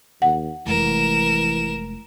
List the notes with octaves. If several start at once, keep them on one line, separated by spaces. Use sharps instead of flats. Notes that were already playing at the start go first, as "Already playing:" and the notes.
D#2 F#5
F1 E3 G#3 A#4 E7